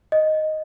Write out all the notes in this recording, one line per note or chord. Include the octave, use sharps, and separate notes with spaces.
D#5